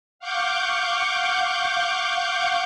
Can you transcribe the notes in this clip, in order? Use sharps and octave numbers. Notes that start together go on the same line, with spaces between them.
F5 F#5 C#6 D6 G6